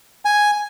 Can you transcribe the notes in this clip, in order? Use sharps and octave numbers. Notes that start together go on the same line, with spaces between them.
G#5